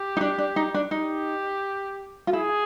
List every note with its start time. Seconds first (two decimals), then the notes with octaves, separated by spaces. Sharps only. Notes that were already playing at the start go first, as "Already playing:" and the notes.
Already playing: G4
0.17 D#4
0.21 D4
0.38 D4
0.56 D#4
0.74 D4
0.91 D#4 G4
2.27 F4
2.33 E4 G#4